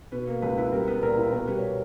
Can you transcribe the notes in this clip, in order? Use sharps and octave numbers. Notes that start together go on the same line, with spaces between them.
B2 B4
A#3
C#2 B4
E4 B4
G3 A#4
B3 B4
A#2 A#4
E4
B2 A#4
G3 B4
C#5
B4